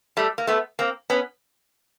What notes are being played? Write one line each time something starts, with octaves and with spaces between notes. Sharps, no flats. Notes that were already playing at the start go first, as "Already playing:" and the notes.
G3 A3
A#3
A3 B3
A#3 C4
B3 C#4